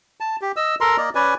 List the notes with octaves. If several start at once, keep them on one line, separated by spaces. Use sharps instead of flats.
A5
G4
D#5 E6
A4 A#4 A#5 C6
A#3 D5 D#5
C#4 B4 D5 G#5